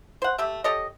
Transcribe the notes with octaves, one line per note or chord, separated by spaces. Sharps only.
C5 F#5
A3 G4 E5
G4 A4 C#5 D#5